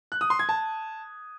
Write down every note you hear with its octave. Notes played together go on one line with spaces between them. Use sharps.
F#6
D#6
C6
G#6
A5